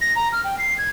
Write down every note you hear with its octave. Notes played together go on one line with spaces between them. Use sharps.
A#6
A#5
F6
G5
C7
G#6